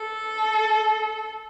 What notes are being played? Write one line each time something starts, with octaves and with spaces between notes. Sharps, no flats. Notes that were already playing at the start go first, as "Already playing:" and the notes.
Already playing: A4